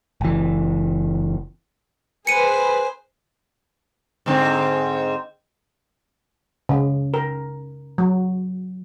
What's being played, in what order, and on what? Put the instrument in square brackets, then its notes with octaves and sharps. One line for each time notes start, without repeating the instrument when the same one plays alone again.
[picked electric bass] F#1 E3
[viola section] G#4 B4 [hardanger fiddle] C5 G#5 [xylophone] C#7 D#7
[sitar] G#2 D3 C4
[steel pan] C#3
A#4
F#3